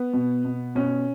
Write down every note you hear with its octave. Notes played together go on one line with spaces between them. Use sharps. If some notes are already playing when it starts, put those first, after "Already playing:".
Already playing: B3
B2
B2
B2 C#4